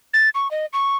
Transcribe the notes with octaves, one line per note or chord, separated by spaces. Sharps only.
A6
C#6
D#5
C#6